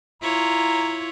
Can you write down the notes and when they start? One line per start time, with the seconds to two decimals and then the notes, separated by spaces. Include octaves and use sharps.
0.22 E4 F4 C#5 A#5